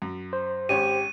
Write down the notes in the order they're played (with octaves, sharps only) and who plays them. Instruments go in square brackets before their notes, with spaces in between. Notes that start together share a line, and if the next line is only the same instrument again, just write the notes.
[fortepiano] F#2
[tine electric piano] C5
[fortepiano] G#1 C#4 C#5 [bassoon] G4 [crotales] D#7